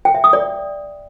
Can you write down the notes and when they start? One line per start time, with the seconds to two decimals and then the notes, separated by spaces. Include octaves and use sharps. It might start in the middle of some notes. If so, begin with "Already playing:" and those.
0.05 G5
0.15 E5
0.24 D#6
0.33 D5